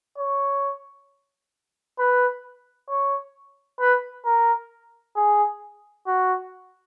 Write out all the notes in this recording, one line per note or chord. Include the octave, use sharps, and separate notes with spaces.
C#5
B4
C#5
B4
A#4
G#4
F#4